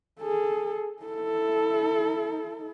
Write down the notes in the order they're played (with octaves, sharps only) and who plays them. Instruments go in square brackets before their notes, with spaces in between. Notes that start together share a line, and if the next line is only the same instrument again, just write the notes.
[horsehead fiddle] G#4 A4
E4 A4